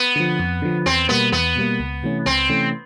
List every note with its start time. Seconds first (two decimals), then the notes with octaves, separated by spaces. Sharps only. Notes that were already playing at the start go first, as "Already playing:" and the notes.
Already playing: B3
0.16 D3 F3
0.39 F2
0.62 D3 F3
0.86 E2 C4
1.09 B2 G3 A#3 B3
1.32 E2 B3
1.56 B2 G3 A#3
1.80 C#2
2.03 C3 E3 A3 C#4
2.26 C#2 C4
2.49 C3 E3 A3 C#4